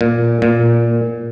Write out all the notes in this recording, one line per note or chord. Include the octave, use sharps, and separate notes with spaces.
A#2
A#2